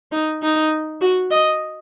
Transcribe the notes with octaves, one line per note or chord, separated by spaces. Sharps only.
D#4
D#4
F#4
D#5